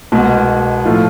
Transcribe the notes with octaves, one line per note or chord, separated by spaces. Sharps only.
C2 B2 G#3
A2 F3 A3 F4